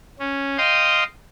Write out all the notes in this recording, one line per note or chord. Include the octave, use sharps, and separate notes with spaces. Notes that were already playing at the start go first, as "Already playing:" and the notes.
C#4
D#5 F5 G5 C6 D#6